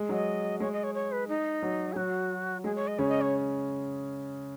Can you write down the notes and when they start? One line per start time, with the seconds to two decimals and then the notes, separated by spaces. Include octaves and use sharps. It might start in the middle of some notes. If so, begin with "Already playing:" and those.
Already playing: G#3
0.09 F#3 D#5
0.60 G#3 C#5
0.72 D#5
0.84 C#5
0.94 C#5
1.12 B4
1.28 D#4
1.62 F#3
1.92 G#4
1.96 F#3 F#4
2.64 G#3 G#4
2.75 C#5
2.87 D#5
2.99 C#3 C#4 C#5
3.09 D#5
3.21 C#5